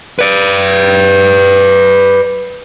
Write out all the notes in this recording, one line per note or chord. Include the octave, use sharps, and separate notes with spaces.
B4 D5